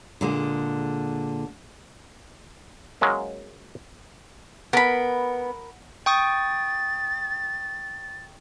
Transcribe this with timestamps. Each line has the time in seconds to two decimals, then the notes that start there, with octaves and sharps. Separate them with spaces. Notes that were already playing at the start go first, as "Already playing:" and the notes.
0.21 A#2 D3 G#3
3.01 F#3 G#3 A#3 C#4
4.73 B3 A#4 B5
6.06 G5 C#6 D#6 A6